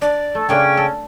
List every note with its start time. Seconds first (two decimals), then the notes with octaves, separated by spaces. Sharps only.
0.02 D4 D5
0.35 A3 A4
0.49 C#3 A3 A#3 C#4 D4 G5
0.77 A4